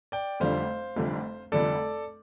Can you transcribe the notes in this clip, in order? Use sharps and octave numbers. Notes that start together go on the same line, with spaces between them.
D5 G5
F1 F2 D3 G3 D4 C5 F5
F1 F2 D3 G3 D4
F1 F2 D3 G3 D4 A4 D5